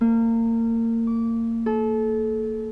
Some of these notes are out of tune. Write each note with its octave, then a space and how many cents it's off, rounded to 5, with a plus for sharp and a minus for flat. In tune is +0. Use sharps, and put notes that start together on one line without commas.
A#3 -30
D6 -25
A4 -30